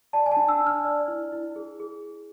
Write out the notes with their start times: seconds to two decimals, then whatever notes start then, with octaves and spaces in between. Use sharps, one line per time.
0.13 D5 A5
0.26 G#5
0.32 A5
0.37 D4
0.49 E6
0.61 D4
0.67 F6
0.85 D5
1.08 E4
1.32 E4
1.56 G#4
1.80 G#4